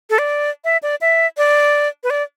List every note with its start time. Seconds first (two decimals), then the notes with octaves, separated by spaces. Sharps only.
0.10 A4
0.19 D5
0.65 E5
0.83 D5
1.01 E5
1.37 D5
2.04 B4
2.10 D5